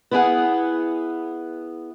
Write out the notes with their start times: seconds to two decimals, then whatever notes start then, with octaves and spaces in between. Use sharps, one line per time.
0.11 B3 E4 G#4 F#5